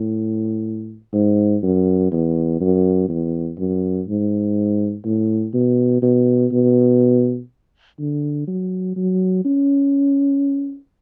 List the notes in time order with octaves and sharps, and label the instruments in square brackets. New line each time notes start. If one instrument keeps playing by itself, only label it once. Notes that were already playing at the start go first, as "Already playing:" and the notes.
Already playing: [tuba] A2
G#2
F#2
E2
F#2
E2
F#2
G#2
A2
B2
B2
B2
D3
F#3
F#3
C#4